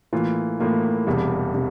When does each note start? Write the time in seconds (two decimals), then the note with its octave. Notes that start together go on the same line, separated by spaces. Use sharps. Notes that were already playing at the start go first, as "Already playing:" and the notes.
0.13 A2 E3 A#3 F4
0.60 A2 E3 A#3 F4
1.07 E1 E2 C3 G3
1.54 C3 G3